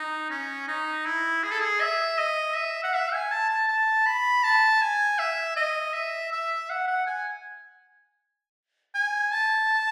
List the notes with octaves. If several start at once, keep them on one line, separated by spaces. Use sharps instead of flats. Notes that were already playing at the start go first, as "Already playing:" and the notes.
Already playing: D#4
C#4
D#4
E4
G#4
A4
G#4
E5
D#5
E5
F#5
E5
G#5
A5
A5
A5
B5
A5
G#5
E5
D#5
E5
E5
F#5
F#5
G#5
G#5
A5